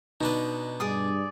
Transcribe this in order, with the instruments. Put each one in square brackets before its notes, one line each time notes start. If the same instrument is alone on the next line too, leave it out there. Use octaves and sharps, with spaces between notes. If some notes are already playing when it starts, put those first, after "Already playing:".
[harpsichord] B2 D4 B4 [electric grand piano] D#4
[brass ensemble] G2 [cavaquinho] G#4 D5 D#6